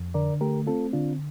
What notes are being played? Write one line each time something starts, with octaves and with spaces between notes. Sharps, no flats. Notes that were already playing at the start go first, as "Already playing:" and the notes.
Already playing: F2
D3 A#4 D5
A3 G4 A#4
C4 F4 A4
D3 D4 F4